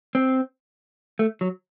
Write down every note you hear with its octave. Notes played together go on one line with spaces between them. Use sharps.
C4
A3
F#3